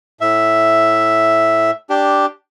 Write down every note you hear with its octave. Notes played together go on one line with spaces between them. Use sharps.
A2 E5
D4 G4